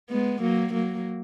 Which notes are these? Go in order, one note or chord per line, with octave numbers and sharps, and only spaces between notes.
G#3 B3
F#3 A#3
F#3 A#3